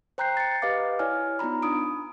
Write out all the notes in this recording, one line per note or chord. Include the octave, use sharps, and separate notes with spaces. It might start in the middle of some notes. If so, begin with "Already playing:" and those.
C5 G5 A#5 F#6 G6 C7
A6 C#7
G4 B4 D#5 F5 D6
E4 C#5 D5 G#5 F6
B3 D#4 F4 A#5 B5
D4 B5 D#6 D7